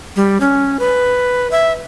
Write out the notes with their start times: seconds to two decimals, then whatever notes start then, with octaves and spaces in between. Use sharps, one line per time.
0.16 G3
0.41 C#4
0.79 B4
1.52 E5